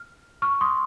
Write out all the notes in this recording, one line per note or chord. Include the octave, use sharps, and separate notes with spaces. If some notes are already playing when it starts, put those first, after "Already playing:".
Already playing: F6
C#6 F6
C6 D#6